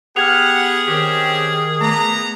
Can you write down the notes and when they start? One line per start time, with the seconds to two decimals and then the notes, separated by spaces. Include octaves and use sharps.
0.16 B3 G4 G#4 F#5 F6 G#6 F7
0.88 D#3 C4 C#4 G4
1.81 A3 B3 D5 A#5